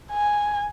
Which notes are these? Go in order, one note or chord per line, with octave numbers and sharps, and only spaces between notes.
G#5